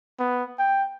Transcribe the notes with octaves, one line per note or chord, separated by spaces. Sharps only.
B3
G5